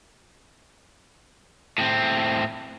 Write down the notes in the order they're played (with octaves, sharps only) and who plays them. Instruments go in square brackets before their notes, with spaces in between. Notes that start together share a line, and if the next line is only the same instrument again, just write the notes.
[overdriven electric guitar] A2 C4